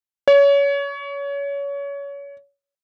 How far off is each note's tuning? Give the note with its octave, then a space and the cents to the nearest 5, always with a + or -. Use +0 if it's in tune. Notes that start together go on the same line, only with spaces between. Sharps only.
C#5 +25